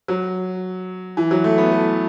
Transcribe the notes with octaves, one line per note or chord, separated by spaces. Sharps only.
F#3
E3
F#3
A3
B3
A3